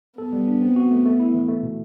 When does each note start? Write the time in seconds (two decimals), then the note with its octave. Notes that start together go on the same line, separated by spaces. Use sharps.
0.18 B3 A4
0.33 G3
0.47 D4
0.62 C4
0.76 F#4
0.91 A3
1.06 A3
1.20 E4
1.34 E3
1.49 A3
1.63 B2